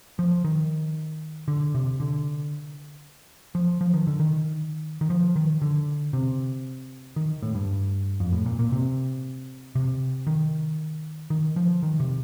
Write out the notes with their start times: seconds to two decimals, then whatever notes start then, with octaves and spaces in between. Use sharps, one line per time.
0.19 F3
0.44 D#3
1.48 D3
1.74 C3
2.00 D3
3.55 F3
3.81 F3
3.94 D#3
4.07 D3
4.20 D#3
5.01 D#3
5.10 F3
5.36 D#3
5.62 D3
6.13 C3
7.16 D#3
7.42 A2
7.55 G2
8.20 F2
8.33 A2
8.46 A#2
8.59 A#2
8.72 C3
9.75 C3
10.27 D#3
11.30 D#3
11.56 F3
11.83 D#3
12.00 C3